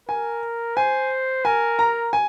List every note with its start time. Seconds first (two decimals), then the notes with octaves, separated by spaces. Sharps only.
0.08 A#4 G#5
0.76 C5 G#5
1.45 A#4 G#5
1.79 A#5
2.13 G#5